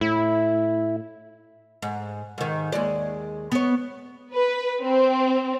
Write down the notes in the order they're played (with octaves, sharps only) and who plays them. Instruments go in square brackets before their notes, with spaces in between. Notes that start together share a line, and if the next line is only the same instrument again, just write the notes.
[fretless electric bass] A2 [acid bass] E4
[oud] G#2
G#2 D#3
D#2 G#3 D5
B3 C#5
[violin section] B4
C4